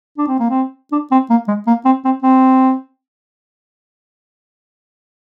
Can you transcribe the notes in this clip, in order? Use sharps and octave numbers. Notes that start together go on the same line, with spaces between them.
D4
C4
A#3
C4
D4
C4
A#3
G#3
A#3
C4
C4
C4